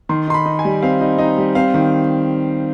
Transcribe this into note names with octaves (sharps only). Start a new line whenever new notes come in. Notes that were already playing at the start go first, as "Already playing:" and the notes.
D#3 C6
D#4 C6
B5
D#4
G#5
G3
C4 F5
D#4
D#4 D#5
G3
C4 F5
D#3